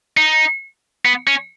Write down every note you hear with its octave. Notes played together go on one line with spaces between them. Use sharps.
D#4
B3
C#4